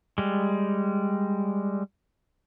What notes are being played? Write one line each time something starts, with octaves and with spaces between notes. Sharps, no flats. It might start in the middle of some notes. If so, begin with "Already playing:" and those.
G3 G#3